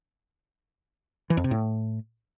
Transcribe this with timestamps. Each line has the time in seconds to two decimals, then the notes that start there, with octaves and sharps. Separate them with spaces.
1.30 E3
1.37 F2
1.44 C3
1.51 A2